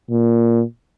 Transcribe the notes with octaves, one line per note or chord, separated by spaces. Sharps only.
A#2